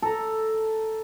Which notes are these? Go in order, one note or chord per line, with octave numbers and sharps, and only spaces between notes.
A4 A#5